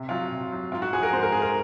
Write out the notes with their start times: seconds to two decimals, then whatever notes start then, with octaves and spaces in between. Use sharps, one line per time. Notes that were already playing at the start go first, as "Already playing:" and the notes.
Already playing: C3
0.09 F#3 F4
0.31 C3
0.52 F#3
0.72 G#2 F4
0.82 F#4
0.93 F3 G#3 G#4
1.03 A#4
1.13 G#2 C5
1.23 A#4
1.32 F3 G#3 G#4
1.42 A#4